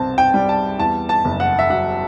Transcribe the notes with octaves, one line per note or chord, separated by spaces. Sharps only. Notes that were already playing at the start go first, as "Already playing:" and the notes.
Already playing: C2 B2 C4 A5
G5
G3
A5
E2 A5
A5
F#1
F#5
E5
F#3 F#5